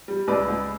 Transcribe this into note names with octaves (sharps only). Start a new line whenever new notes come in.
G3
C#2 B4 D5
C#2